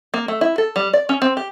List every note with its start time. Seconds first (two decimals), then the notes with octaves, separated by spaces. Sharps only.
0.14 A#3
0.28 A3
0.41 E4
0.58 A4
0.76 G3
0.93 D5
1.09 C#4
1.22 C4
1.37 G4